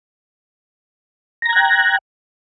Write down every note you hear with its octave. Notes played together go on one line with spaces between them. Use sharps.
G5 A#5 F#6 G#6 A#6